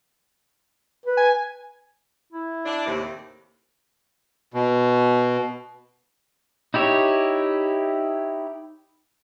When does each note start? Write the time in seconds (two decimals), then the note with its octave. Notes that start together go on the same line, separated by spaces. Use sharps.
1.06 B4
1.17 G#5
2.33 E4
2.66 D4
2.85 D#2 A2 C3
4.54 B2
6.74 D#4 E4 G4 C#5